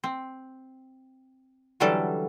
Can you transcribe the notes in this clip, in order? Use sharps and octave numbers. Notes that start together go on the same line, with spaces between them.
C4
D3 E3 F#3 G3 C#4 A4